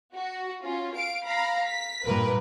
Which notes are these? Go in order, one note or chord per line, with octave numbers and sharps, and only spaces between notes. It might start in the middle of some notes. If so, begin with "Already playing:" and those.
F#4
C#4 F4
F5 D7
F5 A#5 B5
B6
G2 A#2 A#4 B4